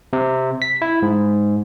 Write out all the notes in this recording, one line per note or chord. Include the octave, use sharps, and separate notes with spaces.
C3
B6
E4
G#2